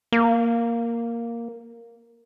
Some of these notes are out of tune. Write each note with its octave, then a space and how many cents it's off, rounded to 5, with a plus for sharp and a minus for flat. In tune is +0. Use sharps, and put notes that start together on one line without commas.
A#3 +0